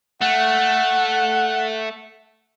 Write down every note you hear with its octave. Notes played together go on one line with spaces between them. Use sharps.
A3 F#5